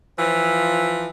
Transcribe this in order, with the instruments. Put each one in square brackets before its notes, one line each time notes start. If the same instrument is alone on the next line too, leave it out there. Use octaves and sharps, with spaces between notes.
[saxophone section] E3 F3